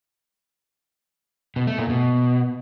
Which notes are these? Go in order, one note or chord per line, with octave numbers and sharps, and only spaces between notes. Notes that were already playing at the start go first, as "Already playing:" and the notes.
B2
A3
A#2
B2